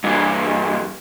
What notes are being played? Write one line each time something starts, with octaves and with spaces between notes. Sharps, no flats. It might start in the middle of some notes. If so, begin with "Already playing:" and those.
G2 E3